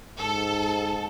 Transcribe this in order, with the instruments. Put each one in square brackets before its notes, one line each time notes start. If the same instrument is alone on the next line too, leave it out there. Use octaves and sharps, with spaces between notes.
[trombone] G#2 [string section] A4